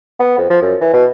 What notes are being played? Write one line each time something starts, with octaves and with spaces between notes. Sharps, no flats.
B3
F2
F3
F#2
E3
B2